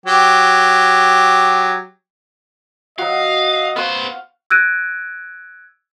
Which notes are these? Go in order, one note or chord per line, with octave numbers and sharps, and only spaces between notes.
F#3 G4
F#3 F#4 D#5 F5
B3 C5 F5 F#5 C#6
E6 F#6 G#6 A#6 D7 D#7